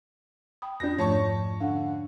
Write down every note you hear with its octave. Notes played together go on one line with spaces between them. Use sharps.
G5 B5 D#6
F2 D4 F4 G6 A#6
G#2 F3 A3 C#5 A5 C#6
D3 F5 F#5